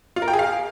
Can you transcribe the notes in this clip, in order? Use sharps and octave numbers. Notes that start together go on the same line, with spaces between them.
F4
A#4
G5
G#4
F5